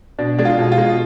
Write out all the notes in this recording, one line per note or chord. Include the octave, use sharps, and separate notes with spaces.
B2 D4
G#3 D4
F4
B2
F4
G#3